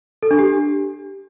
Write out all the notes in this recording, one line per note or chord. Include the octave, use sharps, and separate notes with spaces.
A4
D4
G4